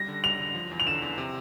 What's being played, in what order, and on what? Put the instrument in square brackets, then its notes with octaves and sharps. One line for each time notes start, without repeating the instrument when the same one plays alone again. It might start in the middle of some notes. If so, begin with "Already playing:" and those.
Already playing: [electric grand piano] G3 [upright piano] A#6
[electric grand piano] D3
[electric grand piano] G3 [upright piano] F7
[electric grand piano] D3
F3
E2
[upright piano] F7
[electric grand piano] D3 [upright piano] E7
[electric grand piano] E2
C3